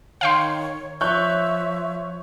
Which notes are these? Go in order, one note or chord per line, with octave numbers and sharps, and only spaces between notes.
D#3 C#5 F5 G5 C6
F3 C#5 E5 F#6 G6